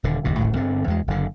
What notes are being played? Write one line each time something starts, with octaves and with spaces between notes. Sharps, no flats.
D#1 D3
F#1 D#2 B2
D1 G#1 A2
G1 D3 C4
E2 G#3
F#1 D3